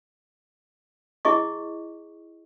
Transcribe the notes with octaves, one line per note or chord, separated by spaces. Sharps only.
E4 G#4 D#5 C#6